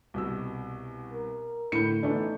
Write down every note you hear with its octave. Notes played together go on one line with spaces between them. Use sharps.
C2 B2 E6
A#4
A2 D3 B5 G6 C#7
E3 A3 B3 D4 D#4